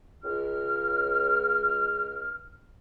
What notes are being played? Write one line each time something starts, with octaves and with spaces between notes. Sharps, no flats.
C#2 F6